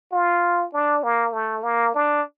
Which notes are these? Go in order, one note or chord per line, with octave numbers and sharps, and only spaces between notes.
F4
D4
A#3
A3
A#3
D4